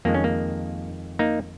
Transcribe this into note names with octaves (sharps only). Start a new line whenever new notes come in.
F2 D#3 G#3 A#3
C#4
A#3
A#3 D#4